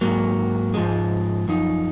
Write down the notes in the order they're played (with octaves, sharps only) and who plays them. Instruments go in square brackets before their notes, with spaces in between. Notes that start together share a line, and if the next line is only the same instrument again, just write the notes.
[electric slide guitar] G#2 F#3 A#3
G#2 F3 G#3
F#2 F3 D#4